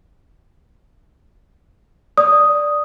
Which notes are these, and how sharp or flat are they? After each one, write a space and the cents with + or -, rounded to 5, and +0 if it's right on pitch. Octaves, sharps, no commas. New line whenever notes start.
D5 +0 D#6 +0